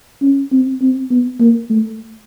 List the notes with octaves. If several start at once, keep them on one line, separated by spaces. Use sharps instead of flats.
C#4
C4
C4
B3
A#3
A3